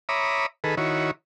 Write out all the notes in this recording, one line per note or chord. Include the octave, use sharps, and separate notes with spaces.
C#5 E5 A#5 B5 D6 D#6
D#3 G#4 A4 B4
D#3 E4 F#4 C#5